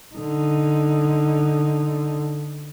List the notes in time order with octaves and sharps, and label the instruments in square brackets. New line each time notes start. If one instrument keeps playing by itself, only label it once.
[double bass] D3 D#4